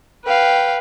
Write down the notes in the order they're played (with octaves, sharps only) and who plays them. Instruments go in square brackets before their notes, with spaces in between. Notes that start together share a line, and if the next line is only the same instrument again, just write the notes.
[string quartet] B4 F5 G5